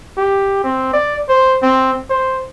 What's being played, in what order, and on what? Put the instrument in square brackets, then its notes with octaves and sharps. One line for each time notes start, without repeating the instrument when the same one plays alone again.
[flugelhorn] G4
C4
D5
C5
C4
C5